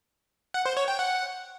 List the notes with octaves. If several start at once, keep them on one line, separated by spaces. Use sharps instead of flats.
F#5
C5
C#5
G5
F#5